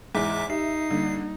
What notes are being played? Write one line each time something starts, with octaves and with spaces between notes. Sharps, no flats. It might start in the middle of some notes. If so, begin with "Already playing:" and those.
E2 G#2 E5 D6 B6
D#4 G4 E5 C7
D3 G3 A#3